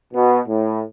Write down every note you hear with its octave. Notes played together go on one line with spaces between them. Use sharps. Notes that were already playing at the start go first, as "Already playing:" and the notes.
B2
A2